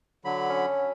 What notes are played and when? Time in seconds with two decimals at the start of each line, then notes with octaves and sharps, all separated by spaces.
0.25 D3 F#3 B5
0.49 C#4